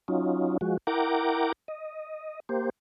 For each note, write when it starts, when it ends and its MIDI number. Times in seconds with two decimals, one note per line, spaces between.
0.08 0.58 54
0.08 0.58 61
0.08 0.58 63
0.08 0.58 65
0.61 0.77 53
0.61 0.77 56
0.61 0.77 66
0.87 1.52 64
0.87 1.52 70
0.87 1.52 78
0.87 1.52 79
0.87 1.52 82
0.87 1.52 86
1.68 2.40 75
2.49 2.70 58
2.49 2.70 67
2.49 2.70 72